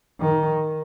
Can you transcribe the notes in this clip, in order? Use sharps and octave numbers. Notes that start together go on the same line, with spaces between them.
D#3